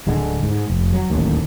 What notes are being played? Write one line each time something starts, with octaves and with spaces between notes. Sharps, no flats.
D1 D3 G#3
G#2
F1
F#3
D1 A1 D#2